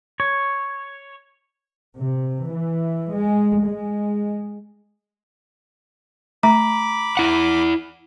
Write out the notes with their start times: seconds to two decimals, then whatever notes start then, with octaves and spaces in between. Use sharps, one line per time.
0.20 C#5
1.98 C3
2.48 E3
3.14 G#3
3.65 G#3
6.43 A3 A#5 B5 D6
7.17 E4 F#5